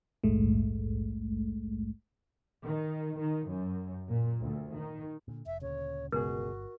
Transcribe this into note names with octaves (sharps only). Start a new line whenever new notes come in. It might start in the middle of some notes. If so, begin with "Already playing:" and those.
A#1 D#2 G#2 G#3 A3
D#3
D#3
F#2
A#2
D2
D#3
A#2 D3
F1 E5
D2 A#2 C#3 C#5
G1 C#2 B2 F#4 G#4 A#4